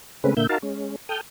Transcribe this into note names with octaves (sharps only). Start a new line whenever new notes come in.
C#3 G#3 A3 C4 C#4 B4
A#2 D3 A#3 E5 G6
D#4 F#4 A#4 F5 A5
G#3 C#4
A4 G5 D#6 F6 G6